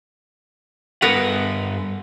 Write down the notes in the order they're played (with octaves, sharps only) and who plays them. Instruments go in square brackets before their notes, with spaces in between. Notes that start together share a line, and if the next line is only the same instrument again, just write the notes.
[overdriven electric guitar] G2 F#5 [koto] B3 A#4 B4